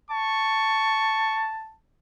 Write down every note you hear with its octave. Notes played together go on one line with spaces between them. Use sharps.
A5 C#6